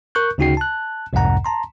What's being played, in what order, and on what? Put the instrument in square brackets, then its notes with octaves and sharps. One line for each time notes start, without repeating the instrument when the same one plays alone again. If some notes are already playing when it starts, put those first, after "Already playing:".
[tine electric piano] A#4 C#6 F#6 G6
D2 C#3 D#4 F#4 G5 C7
A5 F#6
C2 F2 G#2 C3 F#5 A#5
A5 A#5 C6